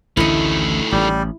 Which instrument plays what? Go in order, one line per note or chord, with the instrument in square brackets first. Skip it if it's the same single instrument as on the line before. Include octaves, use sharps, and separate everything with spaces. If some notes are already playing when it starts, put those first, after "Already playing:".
[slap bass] A1 D2 D3 [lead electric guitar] D#3 A3 [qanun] E4 D#5
[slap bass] A1 [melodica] G3